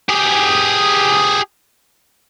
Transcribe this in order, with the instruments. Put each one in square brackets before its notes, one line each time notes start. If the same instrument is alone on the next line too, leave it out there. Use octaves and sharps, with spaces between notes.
[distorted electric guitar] G4 G#4